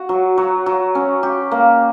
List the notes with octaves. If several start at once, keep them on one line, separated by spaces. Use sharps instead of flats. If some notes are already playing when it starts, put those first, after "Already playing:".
Already playing: F#4
F#3
F#3
F#3
C#4
G4
A#3